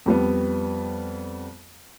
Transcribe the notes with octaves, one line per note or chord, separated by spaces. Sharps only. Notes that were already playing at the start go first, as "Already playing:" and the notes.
F2 G3 B3